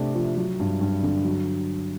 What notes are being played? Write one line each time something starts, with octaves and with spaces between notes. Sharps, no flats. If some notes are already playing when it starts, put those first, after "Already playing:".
Already playing: C3 A3 D4
F3
F#3
G2
G2
D3
F#3